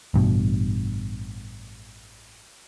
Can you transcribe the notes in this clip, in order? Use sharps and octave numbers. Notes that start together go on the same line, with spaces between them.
A1 G2 B2